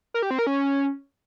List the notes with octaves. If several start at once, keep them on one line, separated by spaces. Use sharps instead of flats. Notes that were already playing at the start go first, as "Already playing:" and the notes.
A#4
G4
C4
A#4
C#4